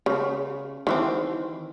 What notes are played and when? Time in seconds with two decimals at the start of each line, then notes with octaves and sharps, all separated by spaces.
0.06 C#3
0.87 D#3 E3 C4